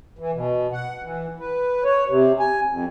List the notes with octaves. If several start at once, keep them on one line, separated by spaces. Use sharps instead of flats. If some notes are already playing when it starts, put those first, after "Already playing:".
E3
B2
F#5
E3
B4
C#5
C3
G#5
F2